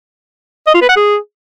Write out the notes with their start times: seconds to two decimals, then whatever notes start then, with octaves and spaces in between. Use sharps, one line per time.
0.67 D#5
0.74 F4
0.82 B4
0.89 F#5
0.96 G#4